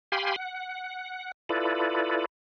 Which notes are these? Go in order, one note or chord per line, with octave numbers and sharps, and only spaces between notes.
G4 F5 G5 G#5 B5 C6
F#5
E4 F4 A4 B4 D5